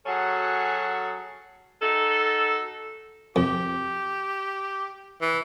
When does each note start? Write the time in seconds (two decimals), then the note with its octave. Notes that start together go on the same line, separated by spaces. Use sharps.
0.06 F#3 C#4 F#4 G#4 A4
1.81 D#4 F#4 A4
3.36 F2 G4
5.21 E3